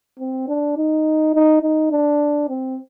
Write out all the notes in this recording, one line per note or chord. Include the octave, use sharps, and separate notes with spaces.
C4
D4
D#4
D#4
D#4
D4
C4